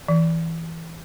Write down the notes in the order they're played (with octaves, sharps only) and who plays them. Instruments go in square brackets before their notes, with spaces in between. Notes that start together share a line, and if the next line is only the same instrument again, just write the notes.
[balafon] E3